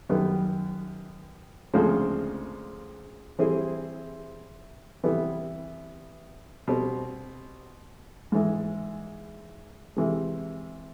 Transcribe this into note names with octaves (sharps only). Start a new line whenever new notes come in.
F#2 D#3 G3 B3
D2 C#3 F3 G#3 C4
E3 G3 C4 E4 G#4
C3 E3 G3 B3 E4
B2 G3 C4
G#2 E3 G#3
C3 E3 G#3